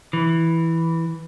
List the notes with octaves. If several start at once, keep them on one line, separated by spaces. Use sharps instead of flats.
E3